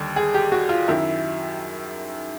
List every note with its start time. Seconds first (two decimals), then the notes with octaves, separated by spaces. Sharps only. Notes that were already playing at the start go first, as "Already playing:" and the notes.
Already playing: D#2 D3 G3
0.16 G#4
0.34 G4
0.52 F#4
0.69 F4
0.88 F#2 D#3 F#3 E4